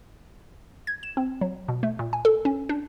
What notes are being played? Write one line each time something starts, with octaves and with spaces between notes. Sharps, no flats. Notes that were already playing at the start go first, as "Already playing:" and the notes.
G#6
E7
C4
F#3
B2
A3
A#2
G#5
A4
C#4
D4